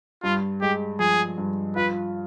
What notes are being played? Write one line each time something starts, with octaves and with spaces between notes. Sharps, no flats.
G2 F4
G#3 G4
F3 G#4
G2
F4 B4